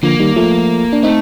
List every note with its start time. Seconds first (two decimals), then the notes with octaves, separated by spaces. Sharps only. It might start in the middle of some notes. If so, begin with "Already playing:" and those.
0.03 D3 F3 A#3
0.20 D#3 G3
0.36 F3 A3
0.93 D4
1.03 A3 C4 D#4